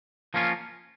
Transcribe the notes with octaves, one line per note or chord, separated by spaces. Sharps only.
F3 A#3 C#4 F4